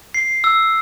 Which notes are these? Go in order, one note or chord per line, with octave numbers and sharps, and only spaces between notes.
C7
E6